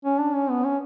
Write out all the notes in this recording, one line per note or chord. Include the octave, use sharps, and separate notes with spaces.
C#4
D4
C#4
B3
C#4